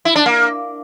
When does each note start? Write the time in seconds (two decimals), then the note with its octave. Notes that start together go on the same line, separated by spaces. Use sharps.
0.05 E4
0.16 D4
0.26 A#3